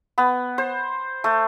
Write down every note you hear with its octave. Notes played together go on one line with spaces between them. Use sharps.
B3
C5
A3